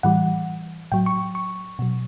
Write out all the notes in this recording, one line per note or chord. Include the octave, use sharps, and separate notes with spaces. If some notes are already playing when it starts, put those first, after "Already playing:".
A2 E3 G3 F#5
A2 F#3 G5
C#6
C#6
B2 F#3